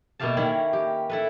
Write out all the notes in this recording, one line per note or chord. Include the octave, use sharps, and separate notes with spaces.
B2 A#3 E4 G4 F5 A5
D#3 A#3 C#4 E4 C#5
G4
E4 A4 B4